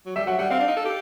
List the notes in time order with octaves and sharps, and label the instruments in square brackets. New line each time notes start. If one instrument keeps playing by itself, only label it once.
[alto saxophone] F#3
[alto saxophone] G3 [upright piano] E5
[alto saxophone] F#3 [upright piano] F#5
[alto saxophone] G3 [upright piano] F#5
[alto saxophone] C4 [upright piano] F5
[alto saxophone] D4
D#4
A4
G4